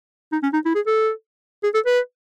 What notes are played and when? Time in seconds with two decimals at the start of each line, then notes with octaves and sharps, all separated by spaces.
0.32 D#4
0.43 C#4
0.53 D#4
0.65 E4
0.75 G#4
0.87 A4
1.63 G#4
1.74 A4
1.86 B4